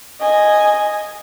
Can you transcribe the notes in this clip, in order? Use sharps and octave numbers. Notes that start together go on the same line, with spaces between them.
D#5 G#5